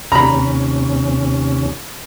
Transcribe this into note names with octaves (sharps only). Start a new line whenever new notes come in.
D#2 C3 C#4 A#5 B5